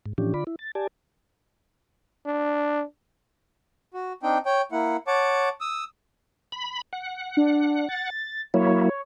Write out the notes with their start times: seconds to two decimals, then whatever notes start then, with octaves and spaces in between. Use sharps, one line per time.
0.06 G#2
0.18 A2 E3 F3 C#4 D4 G4
0.34 D3 F4 D5 B5
0.47 E4
0.59 A6
0.75 G4 D5 G#5 A5
2.26 D4
3.94 F#4
4.23 C4 D4 D#4 G5
4.46 C#5 G5
4.72 A#3 E4 F#5
5.07 C#5 F#5 A5 D6
5.61 D#6 E6
6.52 B5
6.93 F#5
7.37 D4
7.89 A6
8.54 F#3 A#3 E4 C#5